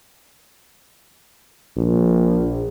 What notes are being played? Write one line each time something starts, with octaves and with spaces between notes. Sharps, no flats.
A#1